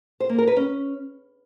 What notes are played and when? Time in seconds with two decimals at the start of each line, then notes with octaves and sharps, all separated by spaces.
0.20 C5
0.29 A#3
0.38 A#4
0.47 B4
0.56 C#4